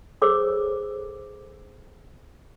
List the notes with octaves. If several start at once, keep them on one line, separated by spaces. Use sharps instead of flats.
G#4 A4 C5 C#5 D6 E6